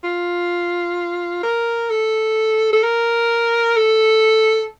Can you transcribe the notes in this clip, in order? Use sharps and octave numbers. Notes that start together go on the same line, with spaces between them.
F4
A#4
A4
A4
A#4
A4